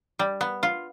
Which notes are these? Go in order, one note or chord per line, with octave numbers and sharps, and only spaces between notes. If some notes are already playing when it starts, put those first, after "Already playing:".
G3
B3
F4